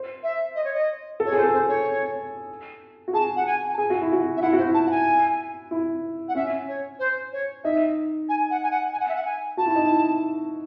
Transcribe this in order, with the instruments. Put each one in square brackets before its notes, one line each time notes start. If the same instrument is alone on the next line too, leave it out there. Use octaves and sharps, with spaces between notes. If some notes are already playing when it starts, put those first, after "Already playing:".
Already playing: [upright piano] C5
[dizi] E5
D#5
C#5
D#5
[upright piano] A4
[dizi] C#5
[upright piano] G#4 [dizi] C5
[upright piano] A4
[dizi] C5
C#5
[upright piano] F#4
[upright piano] G#4 [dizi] A5
[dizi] F#5
G#5
A5
[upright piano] G#4 [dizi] G#5
[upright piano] F#4
E4
F#4
[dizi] E5
[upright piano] E4 [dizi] F#5
[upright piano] F#4 [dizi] C5
[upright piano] E4
[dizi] A5
F#5
G#5
[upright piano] E4
[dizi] F#5
[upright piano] C#4 [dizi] E5
[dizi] C#5
C5
C#5
[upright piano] D#4 [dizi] E5
[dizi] G#5
F#5
G#5
F#5
G#5
F#5
E5
F#5
G#5
[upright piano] F#4 [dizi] A5
[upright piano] E4
D#4
E4